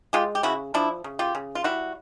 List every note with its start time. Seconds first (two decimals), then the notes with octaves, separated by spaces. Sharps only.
0.13 G#3 F4 G4
0.35 G4
0.43 C#3 E4 F#4
0.74 F3 D4 E4
1.04 C#3
1.19 F4 G4
1.35 C#3
1.55 F4
1.64 G3 E4 F#4